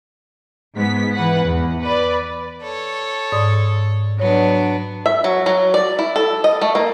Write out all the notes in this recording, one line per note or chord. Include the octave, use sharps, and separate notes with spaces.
G#2 B3 B6
E3 B4 F#5
E2
B4 D5
A4 C#5
G#2 D5 D#6
F#3 B3 D4 C#5
E5
F#3
F#3
D5
E4
A4
D#5
A3
A#3